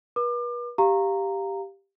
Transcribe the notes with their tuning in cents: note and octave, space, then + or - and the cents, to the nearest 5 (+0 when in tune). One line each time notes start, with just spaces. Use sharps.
B4 -40 D6 +35
G4 +0 F5 +0 A#5 -10